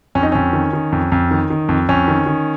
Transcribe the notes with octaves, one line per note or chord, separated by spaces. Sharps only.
F2 C#4
D#4
F2 C#4
D#3
D#3
F2
F2
D#3
D#3
F2
F2 C#4
D#3
D#3